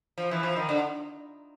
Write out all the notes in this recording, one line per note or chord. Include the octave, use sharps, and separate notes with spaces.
F3
E3
F3
D#3
D3